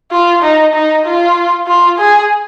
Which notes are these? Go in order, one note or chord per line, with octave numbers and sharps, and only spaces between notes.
F4
D#4
D#4
F4
F4
G#4